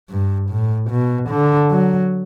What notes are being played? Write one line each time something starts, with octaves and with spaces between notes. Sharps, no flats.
G2
A2
B2
D3
F#3